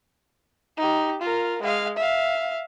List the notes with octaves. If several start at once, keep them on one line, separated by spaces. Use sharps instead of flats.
D#4 G4
F4 A#4
G#3 F5
E5 F5